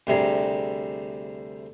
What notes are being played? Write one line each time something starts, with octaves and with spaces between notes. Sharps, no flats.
D2 C3 G3 G#4 A#5